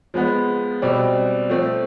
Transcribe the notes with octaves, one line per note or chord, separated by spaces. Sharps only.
F3 G#3 B3
B2 G3 C4
F3 A3 C4